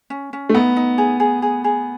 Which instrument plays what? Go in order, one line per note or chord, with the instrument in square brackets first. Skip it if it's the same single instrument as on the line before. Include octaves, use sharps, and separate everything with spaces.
[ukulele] C#4
C#4
[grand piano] A3
[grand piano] B3 [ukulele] D#4
[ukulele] D#4
G#4
G#4
G#4
G#4